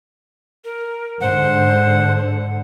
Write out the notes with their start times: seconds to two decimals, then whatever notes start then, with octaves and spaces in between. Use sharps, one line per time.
0.65 A#4
1.21 G#2 D3 C5 F#5